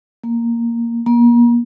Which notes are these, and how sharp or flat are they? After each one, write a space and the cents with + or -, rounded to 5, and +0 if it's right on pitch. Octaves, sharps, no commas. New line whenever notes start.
A#3 +0
A#3 +35